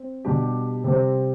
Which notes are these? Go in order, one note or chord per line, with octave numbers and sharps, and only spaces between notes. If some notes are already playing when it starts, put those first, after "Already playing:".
Already playing: C4
B2 G3 D4 G4
C3 G3 C4